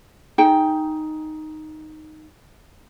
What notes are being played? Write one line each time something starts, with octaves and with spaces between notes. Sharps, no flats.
D#4 G#4 G5